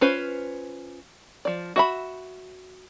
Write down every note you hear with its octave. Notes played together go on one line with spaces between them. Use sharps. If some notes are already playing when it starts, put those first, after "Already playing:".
C#4 F4 B4 C5
F3 D5
F#4 E5 B5